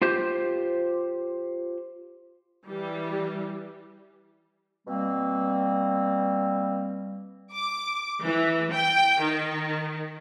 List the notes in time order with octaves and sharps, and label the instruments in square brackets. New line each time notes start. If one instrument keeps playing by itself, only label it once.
[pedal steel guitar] F4 G4 C5 G6
[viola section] E3 G3
[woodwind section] B2 A#3 C4 [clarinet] G3
[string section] D6
E3
G5
D#3